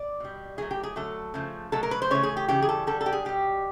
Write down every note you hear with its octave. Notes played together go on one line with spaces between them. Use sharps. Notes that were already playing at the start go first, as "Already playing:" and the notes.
Already playing: D5
B2 G3
A2 F#3 A3 G#4
G4
G#4
D3 F#3 A3 A4
C#3 F3 A3
B2 F#3 A3 A4
A#4
B4
C5
C#3 E3 A3 C#5
G#4
G4
C#3 E3 G3 G4
G#4
A4
D3 G3 A4
A4
G4
G#4
B2 G3 G4